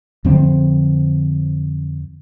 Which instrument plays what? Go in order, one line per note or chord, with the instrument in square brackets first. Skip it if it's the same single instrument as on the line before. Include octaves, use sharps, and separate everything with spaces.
[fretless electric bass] F2 D3 F3 C4